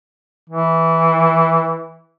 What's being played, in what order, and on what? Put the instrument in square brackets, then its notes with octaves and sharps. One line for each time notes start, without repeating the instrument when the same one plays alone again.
[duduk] E3